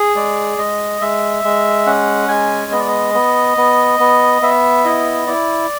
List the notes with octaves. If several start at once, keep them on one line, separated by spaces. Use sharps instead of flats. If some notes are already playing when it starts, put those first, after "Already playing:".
Already playing: G#4
G#3 D5
G#3 D#5
G#3 E5
G#3
C#4 F#5
G#3 G#5
B3 D#5
D5
D#5
B3
B3
B3
B3 E5
E4 D#5
E4 D5